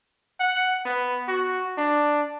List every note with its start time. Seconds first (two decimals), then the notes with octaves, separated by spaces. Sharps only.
0.40 F#5
0.86 B3
1.28 F#4
1.78 D4